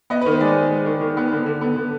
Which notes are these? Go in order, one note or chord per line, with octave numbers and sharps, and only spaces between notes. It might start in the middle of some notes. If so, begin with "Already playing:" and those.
B3 D#5
D#3 B4
C5
G#3 D5
G#3
G#3
D#3
D#3
B3
D3
D3
B3
D3